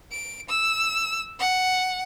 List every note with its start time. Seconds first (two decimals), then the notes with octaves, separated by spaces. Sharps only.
0.11 D7
0.49 E6
1.40 F#5